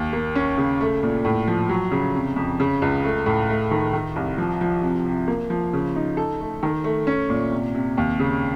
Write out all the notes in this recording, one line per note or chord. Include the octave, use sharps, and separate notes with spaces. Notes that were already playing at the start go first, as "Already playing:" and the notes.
Already playing: D#2
A#3
C#4
C#3
A3
A#2
A2
F3
F#3
C#3
C3
F2
C#3
C#2
A3
A2
A3
D#3
D#3
C2
F3
F3
C3
C3
A#3
F3
C#3
D#4
A4
A3
D#3
A3
C#4
A#2
C3
C3
D#2
C#3